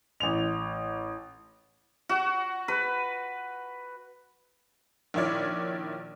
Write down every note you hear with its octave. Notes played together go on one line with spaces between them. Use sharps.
A1 F7
F#4
B4
A#1 D#3 E4 C#5 D5 F6